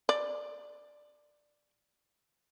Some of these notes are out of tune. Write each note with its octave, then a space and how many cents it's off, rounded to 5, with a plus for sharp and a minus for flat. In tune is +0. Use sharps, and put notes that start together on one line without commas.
D5 +10